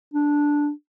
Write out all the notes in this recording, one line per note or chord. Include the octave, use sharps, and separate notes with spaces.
D4